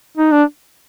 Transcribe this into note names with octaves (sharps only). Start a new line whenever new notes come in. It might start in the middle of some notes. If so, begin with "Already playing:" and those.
D#4
D4